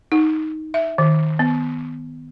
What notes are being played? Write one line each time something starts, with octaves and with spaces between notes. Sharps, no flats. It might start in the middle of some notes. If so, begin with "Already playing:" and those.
D#4
E5
D#3
B3